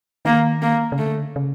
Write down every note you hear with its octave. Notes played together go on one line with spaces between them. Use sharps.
D#3 A#3
A#3
C#3
D3 A3
C#3